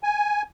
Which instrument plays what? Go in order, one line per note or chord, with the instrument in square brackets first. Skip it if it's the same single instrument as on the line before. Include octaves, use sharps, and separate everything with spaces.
[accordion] G#5